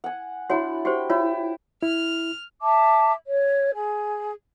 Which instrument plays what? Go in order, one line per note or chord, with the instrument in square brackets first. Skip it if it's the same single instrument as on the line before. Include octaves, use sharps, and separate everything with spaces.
[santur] F#5 G#5
[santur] D4 E4 F#5 [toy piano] F#4 C#5 G#5
[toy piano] F#4 G4 C5 [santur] G5
[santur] E4 [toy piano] F4 C#5
[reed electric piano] E4 [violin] F6
[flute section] E5 A5 D6
C#5
G#4